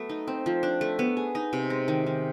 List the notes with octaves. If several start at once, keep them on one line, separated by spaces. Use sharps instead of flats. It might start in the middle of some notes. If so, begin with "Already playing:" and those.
Already playing: F#3 A3 B3
D#4
C4
F3
D4
A3
B3
G#4
D#4
C3
G#3
D#3
D#3